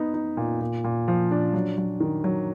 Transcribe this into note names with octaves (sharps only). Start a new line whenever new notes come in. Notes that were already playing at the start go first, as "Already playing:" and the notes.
Already playing: B3 D#4
D#4
A#2
A#2
A#2
F3
D4
F#3
F#3
D#3
F#3